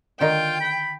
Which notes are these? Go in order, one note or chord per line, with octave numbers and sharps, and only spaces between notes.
D3 D#3 D#4 F4 G5
B5